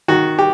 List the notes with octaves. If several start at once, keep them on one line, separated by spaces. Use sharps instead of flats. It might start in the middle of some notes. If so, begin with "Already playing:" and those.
D#3 F#4
G4